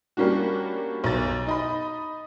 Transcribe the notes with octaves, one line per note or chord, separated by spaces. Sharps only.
G3 A#3 C#4 D4 F#4
B1 A6
D#4 D#5 B5